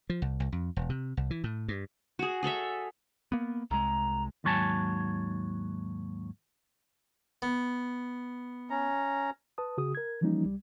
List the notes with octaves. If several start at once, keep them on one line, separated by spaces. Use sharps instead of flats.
F3
C2
C2
F2
E1
C3
C2
E3
A2
G2
F#4 G#4
G#4 A4 C#5 E5
A#3 B3
C2 G#3 A#5
D#2 G#2 F#3 C#5 G#5 A5
B3
C#4 A#5
B4 A5 D#6
C#3 F#4 G#4 D#6
A#4 G#6
E3 F3 G3 A#3 C#4 D#4
C2 G3